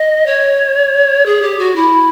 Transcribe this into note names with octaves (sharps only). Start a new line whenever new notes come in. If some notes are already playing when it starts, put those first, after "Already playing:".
Already playing: D#5
C#5
G#4
G4
F#4
E4